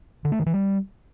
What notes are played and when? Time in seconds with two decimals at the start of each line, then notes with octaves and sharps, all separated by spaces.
0.25 D3
0.32 A3
0.39 D#3
0.46 E3
0.54 G3